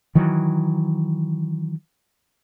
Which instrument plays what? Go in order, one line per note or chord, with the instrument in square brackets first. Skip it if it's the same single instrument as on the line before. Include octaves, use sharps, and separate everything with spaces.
[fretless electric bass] D#3 E3 F#3